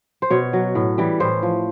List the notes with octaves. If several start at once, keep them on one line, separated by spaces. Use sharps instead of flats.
C5
B2 C#5
F#3
A2
E3 G3
A2 C5
F3